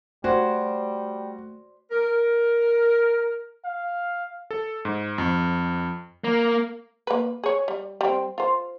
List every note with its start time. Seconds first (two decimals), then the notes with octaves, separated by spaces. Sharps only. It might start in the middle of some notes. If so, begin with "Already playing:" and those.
0.24 G3 A3 F#4 C5 D5 G#5
1.91 A#4
3.65 F5
4.51 A4
4.85 G#2
5.18 F2
6.24 A#3
7.07 A#3 B4
7.43 G#4 C#5
7.68 G3
8.01 G3 C4
8.38 F4 C5